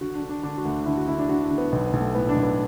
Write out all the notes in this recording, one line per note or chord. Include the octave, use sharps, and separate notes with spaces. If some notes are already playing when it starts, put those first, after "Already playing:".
D3 F#4
D4
D3
D4
D3 D4
F#4
D2
D3 E4
F#4
D3 E4
D4
D3 F#4
E4
D3
B3
B1 B3
B3
B1
A3
A2 B3
D4
B1
B3